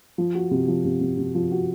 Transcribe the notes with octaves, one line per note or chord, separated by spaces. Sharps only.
F3
F#4
C3
F3
C3
C3
C3
F3
F#4